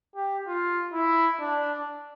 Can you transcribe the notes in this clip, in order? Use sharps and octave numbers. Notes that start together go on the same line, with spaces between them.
G4
F4
E4
D4